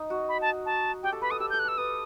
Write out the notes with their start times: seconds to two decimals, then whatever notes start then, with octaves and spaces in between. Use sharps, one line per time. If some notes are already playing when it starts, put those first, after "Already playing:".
Already playing: D#4
0.10 F#4
0.29 B5
0.41 A5
0.66 A5
1.03 G4 G5
1.12 A4
1.22 B4 B5
1.31 A4 D#6
1.40 G4 E6
1.50 G6
1.53 A4
1.59 F#6
1.65 A4 E6
1.78 B4 D#6